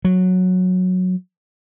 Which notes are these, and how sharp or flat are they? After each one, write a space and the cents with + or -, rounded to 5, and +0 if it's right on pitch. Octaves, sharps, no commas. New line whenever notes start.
F#3 -10